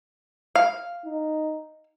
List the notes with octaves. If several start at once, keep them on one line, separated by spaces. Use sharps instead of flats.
F5
D#4